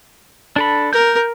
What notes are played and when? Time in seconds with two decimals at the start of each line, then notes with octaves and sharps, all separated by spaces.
0.56 D4 A4 B5
0.93 A#4 G6